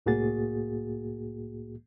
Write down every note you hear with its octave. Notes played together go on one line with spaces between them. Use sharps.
C2 A2 A#3 F#4 G#4 A6